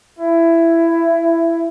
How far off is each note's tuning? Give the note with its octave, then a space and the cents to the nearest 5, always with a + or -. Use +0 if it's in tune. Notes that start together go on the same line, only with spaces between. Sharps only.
E4 +15